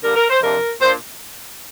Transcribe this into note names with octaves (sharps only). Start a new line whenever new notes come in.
D3 G3 A#3 A#4
A#4
C5
F2 C3 F3 D4 A#4
A#2 A#3 D4 C5